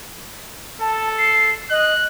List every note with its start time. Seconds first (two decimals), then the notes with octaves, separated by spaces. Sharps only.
0.81 A4 A5
1.18 C7
1.70 D#5 F#6